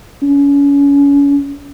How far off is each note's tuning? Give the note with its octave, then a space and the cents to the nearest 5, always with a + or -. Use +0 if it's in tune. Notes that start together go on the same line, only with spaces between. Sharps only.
C#4 +30